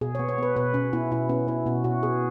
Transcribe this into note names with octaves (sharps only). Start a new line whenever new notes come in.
B2 G#4
B3 C#5
C#5
B3 B4
B2 B4
B2 C#4
B3 E4
B2 E4
B3 C#4
B3 E4
B2 F#4
B2 F#4
B3 G#4